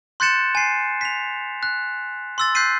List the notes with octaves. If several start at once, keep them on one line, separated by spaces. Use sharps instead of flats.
C6 F#6 G6 A6 C#7 E7
G#5 C7
B6 F7
F#6
C6 E6 A6
F#6 G6 B6 C7 D#7